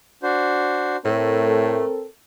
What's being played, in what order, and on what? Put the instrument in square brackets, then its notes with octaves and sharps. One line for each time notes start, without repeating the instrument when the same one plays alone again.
[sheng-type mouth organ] D4 F#4 C5
[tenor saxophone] A2 [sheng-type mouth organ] A3 [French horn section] C4 A4 A#4